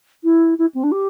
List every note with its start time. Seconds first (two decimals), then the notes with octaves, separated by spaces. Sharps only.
0.24 E4
0.58 E4
0.74 C4
0.83 D4
0.92 G4